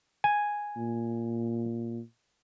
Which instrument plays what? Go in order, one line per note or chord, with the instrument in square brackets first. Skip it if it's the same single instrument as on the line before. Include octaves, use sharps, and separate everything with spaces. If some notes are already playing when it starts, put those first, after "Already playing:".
[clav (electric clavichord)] G#5
[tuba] A#2